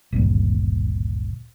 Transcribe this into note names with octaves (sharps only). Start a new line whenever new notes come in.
G#1 D2 G2 A#2